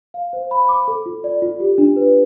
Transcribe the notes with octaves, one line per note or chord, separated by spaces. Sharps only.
F5
C5
B5
D6
A4
F4
D5
F4
G4
D4
B4